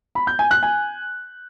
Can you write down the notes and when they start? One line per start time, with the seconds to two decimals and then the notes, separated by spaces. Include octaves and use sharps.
0.15 B5
0.27 G6
0.39 G#5
0.51 F#6
0.63 G#5